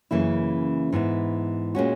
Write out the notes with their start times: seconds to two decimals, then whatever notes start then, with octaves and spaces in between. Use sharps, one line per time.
0.11 F#2 C#3 E3 A#3 E4
0.92 G#2 E3 B3 E4
1.75 A#2 G#3 C#4 F#4